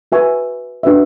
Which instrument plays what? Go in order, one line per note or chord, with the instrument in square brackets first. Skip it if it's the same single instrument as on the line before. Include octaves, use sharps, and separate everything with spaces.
[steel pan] F#4 B4 E5 G#5 C#6
D4 F#4 B4 E5